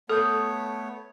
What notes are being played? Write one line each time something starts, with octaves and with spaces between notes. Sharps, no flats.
A3 B3 A4 C#5 D#6 G6